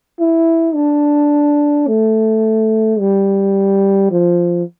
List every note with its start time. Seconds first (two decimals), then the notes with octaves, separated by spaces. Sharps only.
0.20 E4
0.75 D4
1.87 A3
2.99 G3
4.11 F3